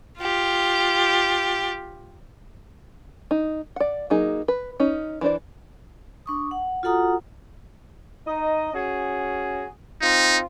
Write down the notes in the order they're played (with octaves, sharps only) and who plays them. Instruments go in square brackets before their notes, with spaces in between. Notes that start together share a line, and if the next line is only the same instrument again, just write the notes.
[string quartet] F4 G4 G5
[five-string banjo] D#4
D5 F#5
F#3 A#3 D#4 G#4
B4
C#4 D#4
E3 D4 C5 D5
[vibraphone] D4 C#6 D#6
F#5
F4 F#4 A4 F#5 A#5 D#6
[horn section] D#4 D#5
C#4 F#4 G#4
[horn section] C4 F4 [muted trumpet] D#4